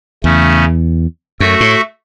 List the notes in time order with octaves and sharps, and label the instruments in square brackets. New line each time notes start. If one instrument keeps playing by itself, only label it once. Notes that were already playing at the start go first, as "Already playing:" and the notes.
[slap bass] E2 [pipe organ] C#3 A3 C#4
[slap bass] F#2 [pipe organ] A3 F#4 A4 E5
[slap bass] A2